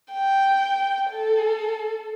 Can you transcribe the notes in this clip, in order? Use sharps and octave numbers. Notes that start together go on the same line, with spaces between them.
G5
A4